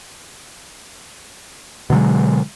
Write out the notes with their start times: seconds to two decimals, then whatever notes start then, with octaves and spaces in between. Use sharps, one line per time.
1.90 B2 D3 F#3 G#3